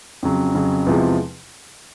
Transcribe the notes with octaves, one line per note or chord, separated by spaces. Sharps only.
F2 C#3 F#3
F2 C#3 F#3
E2 C3 F3 G#3